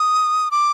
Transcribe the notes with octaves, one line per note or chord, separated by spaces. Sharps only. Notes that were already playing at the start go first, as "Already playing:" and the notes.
Already playing: D#6
D6